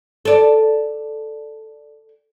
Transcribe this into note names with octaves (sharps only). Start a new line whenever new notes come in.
A4 D5